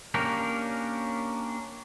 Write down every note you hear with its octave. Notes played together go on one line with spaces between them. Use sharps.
A#3 C#4 D4 G4 A#4